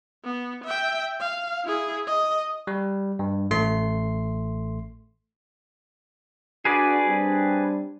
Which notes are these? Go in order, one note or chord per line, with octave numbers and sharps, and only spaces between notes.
B3
E5 G5
F5
E4 G#4
D#5
G3
G2
A1 A3 C6 C7
D4 F#4 G#4 B4 D5
G3 C4 D4